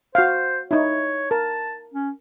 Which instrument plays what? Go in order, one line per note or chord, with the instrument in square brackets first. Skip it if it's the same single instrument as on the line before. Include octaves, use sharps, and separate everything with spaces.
[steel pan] F#4 F5 [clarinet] C5
[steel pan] D#4 E4 [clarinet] C#5
[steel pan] A#4 [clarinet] A5
[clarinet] C#4